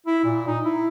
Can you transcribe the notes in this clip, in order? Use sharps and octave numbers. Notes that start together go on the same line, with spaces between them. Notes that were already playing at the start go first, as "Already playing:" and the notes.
E4
A#2
D#4
E4